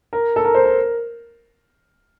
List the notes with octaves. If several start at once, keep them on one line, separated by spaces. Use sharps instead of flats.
A#4
A4
A#4
C5
A#4